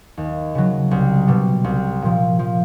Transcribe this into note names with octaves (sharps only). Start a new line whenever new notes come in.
D#2
C#3 F#3
C2
B2 G3
C2
A#2 F3
F3